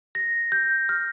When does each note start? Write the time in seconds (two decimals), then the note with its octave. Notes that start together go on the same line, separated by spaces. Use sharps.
0.15 A#6
0.52 G6
0.89 F6